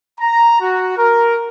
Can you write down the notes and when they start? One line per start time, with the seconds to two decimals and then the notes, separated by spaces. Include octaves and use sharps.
0.19 A#5
0.61 F#4
0.98 A#4